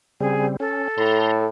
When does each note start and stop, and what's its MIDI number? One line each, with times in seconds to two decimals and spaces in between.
0.21 0.56 49
0.21 0.56 55
0.21 0.56 60
0.21 0.46 68
0.60 0.88 61
0.60 1.46 69
0.98 1.47 45
0.98 1.31 82
0.98 1.31 84